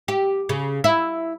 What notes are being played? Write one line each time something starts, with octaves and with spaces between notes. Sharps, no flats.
G4
C#3
E4